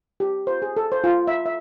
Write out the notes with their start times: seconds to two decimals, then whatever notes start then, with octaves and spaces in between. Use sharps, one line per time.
0.20 G4
0.47 C5
0.62 G#4
0.77 A4
0.92 C5
1.04 F4
1.27 E5
1.46 E5